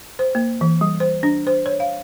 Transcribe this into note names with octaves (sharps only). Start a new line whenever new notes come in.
C5
A#3
E3
G3
C5
D4
C5
C#5
F5